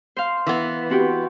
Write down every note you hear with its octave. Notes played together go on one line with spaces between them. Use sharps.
C5 F5
E3 B3
C4 F#4 G4